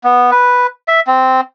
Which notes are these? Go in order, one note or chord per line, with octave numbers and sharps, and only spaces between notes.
B3
B4
E5
C4